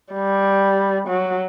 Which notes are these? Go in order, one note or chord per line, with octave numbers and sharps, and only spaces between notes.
G3
F#3